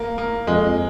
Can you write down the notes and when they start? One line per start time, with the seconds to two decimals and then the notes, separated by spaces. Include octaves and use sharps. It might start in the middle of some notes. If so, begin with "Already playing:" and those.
Already playing: A#3
0.18 A#3
0.47 F2 G#3